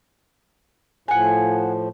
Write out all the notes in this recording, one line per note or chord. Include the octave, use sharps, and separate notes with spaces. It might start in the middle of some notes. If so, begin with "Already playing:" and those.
A2 F3 F#5 G#5